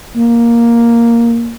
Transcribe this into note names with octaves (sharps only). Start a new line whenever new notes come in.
A#3